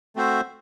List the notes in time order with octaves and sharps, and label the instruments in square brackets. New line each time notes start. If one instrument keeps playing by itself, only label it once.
[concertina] A3 C4 F#4 C5 E5